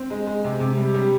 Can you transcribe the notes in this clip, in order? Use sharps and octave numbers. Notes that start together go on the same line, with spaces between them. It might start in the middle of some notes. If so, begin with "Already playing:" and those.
Already playing: C4
G#3
G#3
C3
C3
G3
G3